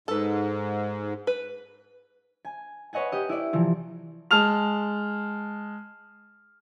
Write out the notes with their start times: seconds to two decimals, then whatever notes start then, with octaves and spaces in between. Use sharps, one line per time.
0.08 G#2 A4 B4
1.27 B4
2.45 G#5
2.93 B4 C#5 D#5 F#5 G#5
3.12 G4 D#5
3.29 E4 D5
3.53 C3 E3 F3
4.31 G#3 A5 F6 F7